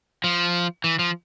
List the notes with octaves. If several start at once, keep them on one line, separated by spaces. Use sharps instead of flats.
F3
E3
F3